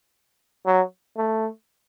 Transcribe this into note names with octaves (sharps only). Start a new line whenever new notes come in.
F#3
A3